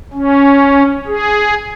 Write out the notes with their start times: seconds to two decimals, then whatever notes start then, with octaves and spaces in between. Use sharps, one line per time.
0.13 C#4
1.07 G#4